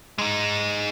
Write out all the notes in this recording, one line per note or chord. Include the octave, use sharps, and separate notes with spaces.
G#3 D#4